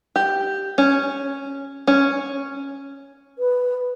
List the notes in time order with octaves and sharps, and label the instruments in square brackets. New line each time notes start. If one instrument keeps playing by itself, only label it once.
[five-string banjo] G4
C#4
C#4
[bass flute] B4